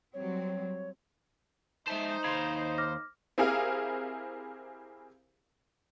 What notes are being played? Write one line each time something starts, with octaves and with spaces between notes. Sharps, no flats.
F#3 G3 C4 C#5
G#3 D#4 C5 E5 A5
D#2 F5 B5 C6 G#6
D6 F6 A#6
C4 E4 G4 G#4 A#4 F5